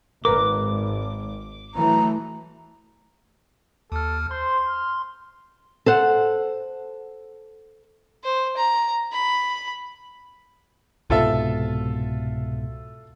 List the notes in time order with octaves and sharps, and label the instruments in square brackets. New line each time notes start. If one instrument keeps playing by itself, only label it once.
[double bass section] G#1 [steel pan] A#4 B4 [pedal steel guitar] D6
[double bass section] E3 F#3 A3 [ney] A#5
[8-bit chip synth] D#2 F6 [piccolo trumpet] A4
[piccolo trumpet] C5 [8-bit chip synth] C6
[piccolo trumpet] F6
[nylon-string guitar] A4 C5 F#5
[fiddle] C5
A#5
B5
[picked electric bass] C2 G#2 B2 [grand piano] F4 A4 E5